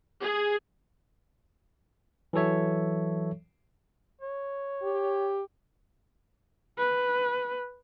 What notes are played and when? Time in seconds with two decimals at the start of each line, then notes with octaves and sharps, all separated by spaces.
0.22 G#4
2.33 E3 F#3 A4 C#5 E5
4.21 C#5
4.83 G4
6.78 B4